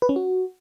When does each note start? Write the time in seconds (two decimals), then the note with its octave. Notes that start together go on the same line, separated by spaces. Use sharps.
0.02 B4
0.09 C#4
0.16 F#4